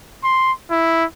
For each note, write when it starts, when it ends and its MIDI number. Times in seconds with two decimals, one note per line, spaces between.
0.24 0.52 84
0.71 1.04 64